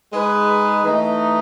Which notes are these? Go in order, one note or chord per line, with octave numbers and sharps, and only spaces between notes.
G#3 D#4 G#4 B4
E3 A3 D#4